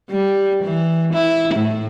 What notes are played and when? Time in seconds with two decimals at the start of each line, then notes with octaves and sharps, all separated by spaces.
0.10 G3
0.64 E3
1.14 E4
1.55 A2